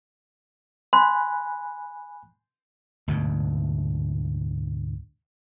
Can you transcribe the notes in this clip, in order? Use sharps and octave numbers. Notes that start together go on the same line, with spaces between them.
G#5 B5 C6 F#6
D2 G#2 B2